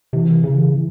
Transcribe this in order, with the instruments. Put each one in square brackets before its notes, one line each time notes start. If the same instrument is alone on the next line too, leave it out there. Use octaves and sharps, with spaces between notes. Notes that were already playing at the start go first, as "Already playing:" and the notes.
[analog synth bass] C3 [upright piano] E3
[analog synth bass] C#3 [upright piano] E3
[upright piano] E3